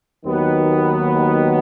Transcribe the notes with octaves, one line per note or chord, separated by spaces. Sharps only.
D#2 D#3 F#3 B3